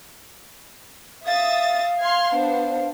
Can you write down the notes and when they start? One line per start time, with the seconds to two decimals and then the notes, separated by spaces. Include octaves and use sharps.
1.27 E5 F5 D#6 A6
1.99 C6 F6 G#6
2.35 B3 D4 C5